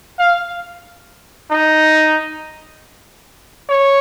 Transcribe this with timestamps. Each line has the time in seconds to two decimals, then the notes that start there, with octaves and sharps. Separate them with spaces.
0.19 F5
1.51 D#4
3.70 C#5